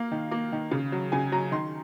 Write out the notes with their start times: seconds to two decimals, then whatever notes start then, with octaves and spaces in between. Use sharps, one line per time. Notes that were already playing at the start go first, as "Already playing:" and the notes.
Already playing: A#3 F5
0.12 D#3
0.31 A#3
0.52 D#3
0.71 C#3
0.92 F#3
1.12 C#3 G#5
1.32 F#3 A#5
1.52 D#3 C6